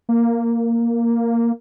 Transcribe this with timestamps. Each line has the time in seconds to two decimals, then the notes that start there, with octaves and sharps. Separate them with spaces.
0.09 A#3